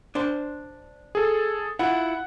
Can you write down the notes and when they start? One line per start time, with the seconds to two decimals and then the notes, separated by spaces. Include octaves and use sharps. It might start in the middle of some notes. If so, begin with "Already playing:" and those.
0.15 D4 C5
1.15 G#4 A4
1.79 E4 F4 F#5